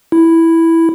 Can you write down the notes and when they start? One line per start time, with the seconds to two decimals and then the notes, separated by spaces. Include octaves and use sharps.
0.12 E4